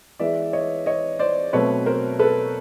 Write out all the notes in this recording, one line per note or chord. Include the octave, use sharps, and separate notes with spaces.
E3 G#3 B3 D5 E5
C#5 D#5
C#5 D#5
C5 D5
B2 F#3 A3 C4 B4 C#5
A#4 C5
A4 B4